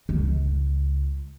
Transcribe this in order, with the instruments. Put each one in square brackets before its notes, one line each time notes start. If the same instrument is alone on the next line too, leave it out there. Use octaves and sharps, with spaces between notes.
[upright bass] C#2